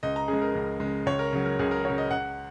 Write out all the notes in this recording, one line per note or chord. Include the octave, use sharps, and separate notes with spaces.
C#2 D#5
A#5
C#3 G#4
G#3
A#4
C#2
C#3 G#3
C#2 C#5
A#4
C#3 F#3
A#4
C#2 G#4
A#4
C#3 F#3 C#5
D#5
C#2 F#5